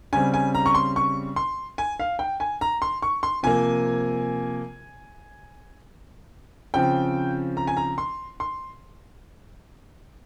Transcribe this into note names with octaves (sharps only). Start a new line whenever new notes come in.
C#3 G3 C4 G#5
G#5
A#5
C#6
C6
C#6
C6
G#5
F5
G5
G#5
A#5
C6
C#6
C6
C3 F3 A#3 G#5
C#3 F3 C4 G5
A#5
G#5
A#5
C6
C6